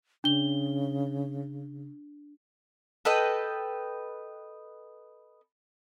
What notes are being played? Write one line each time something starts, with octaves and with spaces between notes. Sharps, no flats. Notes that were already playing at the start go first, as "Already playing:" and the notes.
C#3 D4 G7
A4 B4 D#5 G5